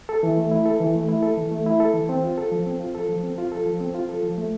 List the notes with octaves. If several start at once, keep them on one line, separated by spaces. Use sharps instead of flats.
A4
E3
A3
E4
A4
E3
A3
E4
A4
E3
A3
E4
A4
E3
C4
F4
A4
F3
C4
F4
A4
F3
C4
F4
A4
F3
C4
F4
A4
F3
A3